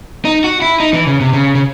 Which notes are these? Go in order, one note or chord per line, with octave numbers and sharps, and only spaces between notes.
D#4
F#4
E4
D#4
E3
C#3
C3
C#3
C#3